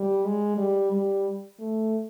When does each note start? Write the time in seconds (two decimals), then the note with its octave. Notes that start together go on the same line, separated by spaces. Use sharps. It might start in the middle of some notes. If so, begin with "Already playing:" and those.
Already playing: G3
0.25 G#3
0.58 G3
0.92 G3
1.59 A3